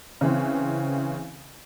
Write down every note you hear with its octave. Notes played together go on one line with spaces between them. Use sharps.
C#3 E3 C4